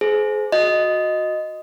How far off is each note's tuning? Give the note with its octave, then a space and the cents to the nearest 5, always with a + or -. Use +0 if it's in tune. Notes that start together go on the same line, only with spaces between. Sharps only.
G#4 +30 C5 -20
F#4 -20 D#5 +0